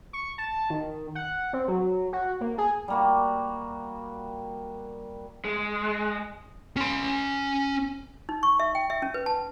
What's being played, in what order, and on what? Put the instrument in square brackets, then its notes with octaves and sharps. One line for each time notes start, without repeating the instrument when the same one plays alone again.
[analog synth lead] C#6
A5
D#3
F#5
C4
F#3
F#4
A#3
G#4
[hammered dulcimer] G3 A#3 F#4
[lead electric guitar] G#3
[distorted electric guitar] C#4 C6
[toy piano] D#4
C#6
E5
G5
E5
C#4
B4
A5